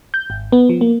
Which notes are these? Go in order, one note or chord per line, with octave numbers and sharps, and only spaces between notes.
G6
G#1
B3
F3
A#3